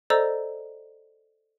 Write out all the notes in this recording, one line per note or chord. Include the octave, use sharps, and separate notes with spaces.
A4 C5 D5 D#5 A#5 E6